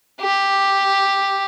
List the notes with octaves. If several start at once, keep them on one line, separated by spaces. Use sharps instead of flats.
G4